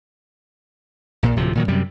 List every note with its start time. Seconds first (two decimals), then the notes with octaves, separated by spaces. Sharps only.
1.23 A#1 A#2
1.36 D1 C3 F3
1.55 A#2 D#3 F#3
1.68 F#2 C3 G3